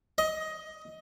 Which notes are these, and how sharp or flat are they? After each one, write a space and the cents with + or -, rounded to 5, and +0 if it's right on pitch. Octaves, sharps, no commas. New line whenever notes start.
D#5 +15